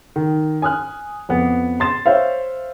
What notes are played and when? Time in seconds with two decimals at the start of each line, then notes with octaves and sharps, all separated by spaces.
0.16 D#3
0.62 G#5 D#6 F6 F#6
1.29 F2 B3
1.80 C6 A6 E7
2.06 C5 C#5 E5 F5